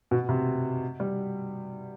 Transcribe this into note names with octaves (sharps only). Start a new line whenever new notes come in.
B2
C3
G3